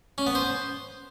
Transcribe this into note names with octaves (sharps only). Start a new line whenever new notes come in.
C#4
B3
C5